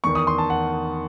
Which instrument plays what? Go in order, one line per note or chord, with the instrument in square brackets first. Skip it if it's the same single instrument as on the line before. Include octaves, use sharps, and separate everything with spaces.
[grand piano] E2 D#3 C#6
D#6
C6
A5
F#5